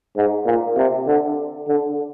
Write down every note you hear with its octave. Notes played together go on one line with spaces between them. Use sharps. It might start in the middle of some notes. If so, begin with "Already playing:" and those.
G#2
A#2
C3
D3
D3